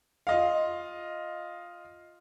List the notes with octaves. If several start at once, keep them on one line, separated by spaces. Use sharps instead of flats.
F4 D#5 F5